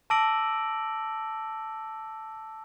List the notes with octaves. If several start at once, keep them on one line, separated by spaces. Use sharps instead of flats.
A5 D6 E6 A#6 D7 F#7